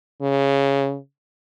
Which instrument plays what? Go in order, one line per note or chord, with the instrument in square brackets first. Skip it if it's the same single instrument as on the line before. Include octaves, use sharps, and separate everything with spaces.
[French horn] C#3